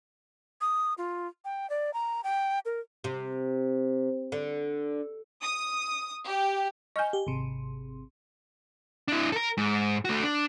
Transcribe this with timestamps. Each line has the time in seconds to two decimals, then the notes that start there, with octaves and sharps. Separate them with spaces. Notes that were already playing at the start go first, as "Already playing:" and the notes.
0.61 D#6
0.98 F4
1.45 G5
1.70 D5
1.94 A#5
2.24 G5
2.65 A#4
3.04 C3
4.32 D3
5.42 D#6
6.26 G4
6.96 D#5 G#5 C#6 F6 G6
7.13 G4
7.27 G#1 C3
9.08 D4 E4
9.32 A4 A#4
9.57 G#2
10.05 A3 F#4
10.23 D4